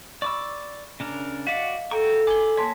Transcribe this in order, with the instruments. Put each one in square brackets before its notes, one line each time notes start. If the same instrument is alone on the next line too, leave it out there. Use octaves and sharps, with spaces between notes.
[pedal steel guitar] D5 D6 E6 [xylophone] B5 C#6
[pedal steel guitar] C#3 D4 A#4
[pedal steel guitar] F#4 D5 F#5 [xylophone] D#5 F5 B6
[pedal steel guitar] F#4 G5 C#6 [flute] A4 [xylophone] A#5
[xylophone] G#5 G#6 G7 [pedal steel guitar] B5 D6
[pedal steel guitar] A#3 C#5 [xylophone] A5 C6 B6